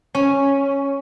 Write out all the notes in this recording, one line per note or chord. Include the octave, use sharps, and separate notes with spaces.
C#4